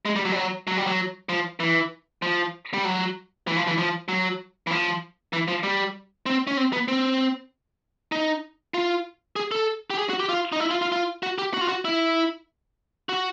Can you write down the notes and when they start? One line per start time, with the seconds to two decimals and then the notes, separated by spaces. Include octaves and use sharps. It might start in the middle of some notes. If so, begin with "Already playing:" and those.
0.05 G#3
0.16 G3
0.25 F#3
0.32 G3
0.36 F#3
0.67 F#3
0.77 G3
0.87 F#3
1.29 F3
1.60 E3
2.22 F3
2.74 G3
2.85 F#3
3.47 E3
3.57 F3
3.67 E3
3.78 F3
4.08 F#3
4.67 E3
4.71 F3
5.33 E3
5.48 F3
5.63 G3
6.26 C4
6.47 C#4
6.57 C4
6.73 B3
6.88 C4
8.12 D#4
8.74 F4
9.36 G#4
9.52 A4
9.90 G4
9.98 G#4
10.09 F#4
10.20 G4
10.29 F4
10.52 D#4
10.60 E4
10.71 F4
10.82 F4
10.92 F4
11.23 F#4
11.38 G4
11.54 F#4
11.61 F4
11.69 F#4
11.85 E4
13.09 F#4